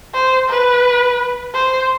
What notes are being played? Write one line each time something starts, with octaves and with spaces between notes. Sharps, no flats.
C5
B4
C5